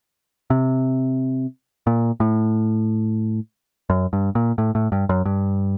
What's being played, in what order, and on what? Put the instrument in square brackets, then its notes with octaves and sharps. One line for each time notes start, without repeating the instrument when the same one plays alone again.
[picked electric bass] C3
A#2
A2
F#2
G2
A#2
A2
A2
G2
F#2
G2